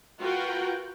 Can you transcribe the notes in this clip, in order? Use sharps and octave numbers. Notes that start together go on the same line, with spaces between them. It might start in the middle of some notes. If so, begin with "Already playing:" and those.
F4 F#4 A#4 B4 F#5 G5